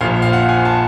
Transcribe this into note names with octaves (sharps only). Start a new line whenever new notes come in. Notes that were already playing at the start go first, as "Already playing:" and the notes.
A#1 A#2 F3 F5
F5
F#5
G#5
A5